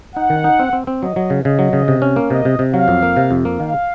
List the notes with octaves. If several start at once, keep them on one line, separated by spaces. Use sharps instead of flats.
D#4 F#5
D#3
D#4
C4
C4
C4
F#3 D#5
F#3
C#3
C#3 D#5
F#3
C#3
C3
C#4
A#3
C3 D#5
C3
C3
F#3 F5
F2
A#3
C3
F2
A#3
D#3 F5